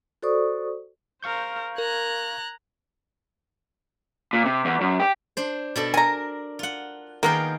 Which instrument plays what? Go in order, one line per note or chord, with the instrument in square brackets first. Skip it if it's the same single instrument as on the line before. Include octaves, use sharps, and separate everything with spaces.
[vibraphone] F#4 A4 C5 D5 C#6 D#6
[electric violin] A#4 C5 [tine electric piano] F5 C#6 G6
[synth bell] A#4 [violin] A#5 F#6 [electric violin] G#6
[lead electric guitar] A#2
C3
E2
F#2
G4
[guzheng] D4 C5
B2 D4 A4
[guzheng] A#4 [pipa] G#5 A#5
[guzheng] F4 F#5
[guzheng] D#3 G#4 G5 [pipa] A#3 B3 A#4